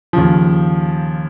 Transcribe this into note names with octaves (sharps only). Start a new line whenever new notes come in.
D#2 C#3 F3